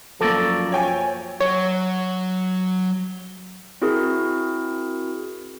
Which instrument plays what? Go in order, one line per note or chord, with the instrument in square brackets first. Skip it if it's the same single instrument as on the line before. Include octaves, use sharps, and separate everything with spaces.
[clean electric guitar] F#2 F#3 D5 [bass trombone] F3 [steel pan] A#3 A4
[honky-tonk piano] C#5 G5 G#5
[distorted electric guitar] F#3 [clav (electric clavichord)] C#5
[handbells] C4 E4 F#4 G#4 A#4